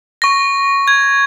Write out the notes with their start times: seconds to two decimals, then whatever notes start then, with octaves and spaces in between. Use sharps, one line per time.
0.22 C#6 A#6
0.88 G#6